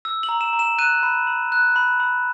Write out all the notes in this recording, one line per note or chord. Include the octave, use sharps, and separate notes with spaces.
E6
F#7
A#5
E7
A#5
E7
F#6 D#7
B5
B5
F#6
B5
B5